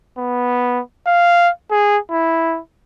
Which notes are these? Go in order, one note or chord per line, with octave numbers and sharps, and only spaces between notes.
B3
F5
G#4
E4